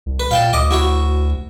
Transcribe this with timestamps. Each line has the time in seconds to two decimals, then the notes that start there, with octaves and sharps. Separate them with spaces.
0.06 C2
0.20 B4
0.31 A#2 F5 G5 A5
0.53 D2 D#5 D6
0.71 E4 F#4 C#5